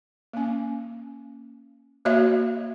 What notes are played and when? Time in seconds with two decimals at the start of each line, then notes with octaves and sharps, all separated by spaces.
0.33 A#3 C#4
2.05 A#3 F#4 C#5 D#5 E5